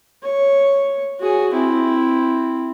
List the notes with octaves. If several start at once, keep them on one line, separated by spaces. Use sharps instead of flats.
C#5
F#4 G#4
C4 E4